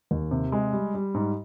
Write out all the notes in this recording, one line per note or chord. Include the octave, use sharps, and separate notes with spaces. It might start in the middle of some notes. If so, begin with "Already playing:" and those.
D#2
C3
G#3
G3
G3
G#2